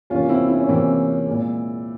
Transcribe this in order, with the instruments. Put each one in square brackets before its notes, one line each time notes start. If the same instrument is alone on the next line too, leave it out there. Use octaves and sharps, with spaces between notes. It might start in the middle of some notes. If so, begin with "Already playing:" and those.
[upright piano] E2 C3 E3 A#3 C#4 F4
C4 E4
E4
C#4
E2 C3 E3 A#3 C4 E4
A#2 G#3